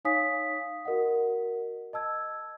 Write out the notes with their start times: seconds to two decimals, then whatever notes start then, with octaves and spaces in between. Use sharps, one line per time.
0.05 D#4 C#5 F5 G#5 D#6 B6
0.85 F#4 A#4 D#5 F#5
1.93 D#5 A5 E6 G#6